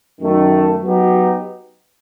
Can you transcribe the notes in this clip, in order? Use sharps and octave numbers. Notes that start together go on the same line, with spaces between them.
F#2 D#3 A3
F#3 B3 D#4 G4